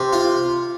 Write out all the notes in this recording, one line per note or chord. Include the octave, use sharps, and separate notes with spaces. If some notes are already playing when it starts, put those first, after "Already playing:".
Already playing: C3
F4